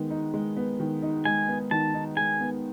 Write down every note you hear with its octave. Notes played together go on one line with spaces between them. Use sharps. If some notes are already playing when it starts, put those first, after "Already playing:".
Already playing: D#3 G#3 B3
D#4
G#3
B3
D#3
D#4
G#3 G#5
B3
D#3 A5
D#4
G#3 G#5
B3